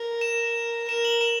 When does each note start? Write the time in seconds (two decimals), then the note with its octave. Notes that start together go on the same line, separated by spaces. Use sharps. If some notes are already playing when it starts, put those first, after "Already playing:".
Already playing: A#4
0.21 E7
0.88 A#4 E7
1.05 F#7
1.21 E7